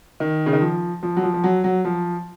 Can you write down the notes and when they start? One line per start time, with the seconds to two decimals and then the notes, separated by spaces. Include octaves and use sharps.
0.20 D#3
0.46 C#3
0.53 D#3
0.61 F3
1.03 F3
1.16 F#3
1.23 F3
1.34 F3
1.44 F#3
1.64 F#3
1.85 F3